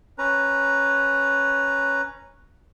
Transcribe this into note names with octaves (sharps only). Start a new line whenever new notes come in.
C#4 B4 A#5